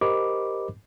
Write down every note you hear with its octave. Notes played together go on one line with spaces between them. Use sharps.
G4 A#4 C5 D#5 B5 D6